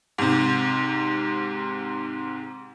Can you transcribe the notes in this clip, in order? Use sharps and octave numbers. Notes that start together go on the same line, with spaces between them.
G#2 C3